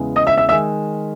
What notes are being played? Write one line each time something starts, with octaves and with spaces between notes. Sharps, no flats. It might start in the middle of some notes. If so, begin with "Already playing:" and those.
Already playing: E2 C#3 G#3 B3 E4
D#5 D#6
E5 E6
E5 E6
D#3 G#3 E5 E6